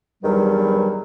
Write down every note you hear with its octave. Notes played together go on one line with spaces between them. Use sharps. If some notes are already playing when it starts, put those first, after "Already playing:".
E2 G2 D#3 F#3 G3